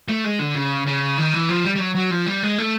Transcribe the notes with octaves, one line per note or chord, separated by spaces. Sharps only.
A3
G#3
D3
C#3
C#3
D#3
E3
F3
G3
G3
F#3
F#3
F3
G3
G#3
A3